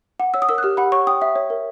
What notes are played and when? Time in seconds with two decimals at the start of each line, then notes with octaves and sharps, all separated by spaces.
0.20 F#5
0.34 C#5 E6
0.42 D#6
0.49 A#4 E6
0.58 F#6
0.63 G4 F6
0.77 F#5 B5
0.92 C#5 C#6
1.07 G5 D#6
1.22 E5
1.36 C#5
1.50 A#4